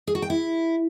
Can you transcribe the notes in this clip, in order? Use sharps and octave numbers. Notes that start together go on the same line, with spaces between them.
G#4
F#4
G5
E4